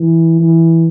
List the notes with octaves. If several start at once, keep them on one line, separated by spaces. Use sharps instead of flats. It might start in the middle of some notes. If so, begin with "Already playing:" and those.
Already playing: E3
E3